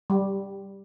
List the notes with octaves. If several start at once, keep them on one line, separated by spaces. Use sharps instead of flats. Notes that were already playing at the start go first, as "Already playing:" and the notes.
G3